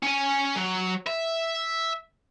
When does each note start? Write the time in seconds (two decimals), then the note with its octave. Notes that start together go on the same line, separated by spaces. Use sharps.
0.03 C#4 G#5
0.56 F#3
1.07 E5